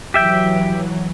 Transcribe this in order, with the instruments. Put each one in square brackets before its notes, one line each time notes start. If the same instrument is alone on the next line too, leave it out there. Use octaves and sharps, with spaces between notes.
[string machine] E3 F#3 [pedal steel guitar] G4 E5 G5